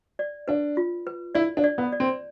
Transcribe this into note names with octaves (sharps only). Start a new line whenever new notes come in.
D5
D4 B4
F4
B4
E4 D5
D4
D5
B3
D5
C4